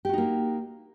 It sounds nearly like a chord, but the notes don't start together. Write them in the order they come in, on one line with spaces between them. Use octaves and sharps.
G4 F#4 D#4 A#3